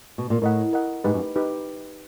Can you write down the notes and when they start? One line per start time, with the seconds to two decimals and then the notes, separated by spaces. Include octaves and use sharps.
0.18 B2
0.30 A#2
0.42 A2 A#4 D#5 F#5
0.73 A#4 D#5 F#5
1.04 G#2 D#4 G4 B4
1.14 F#2
1.35 D#4 G4 B4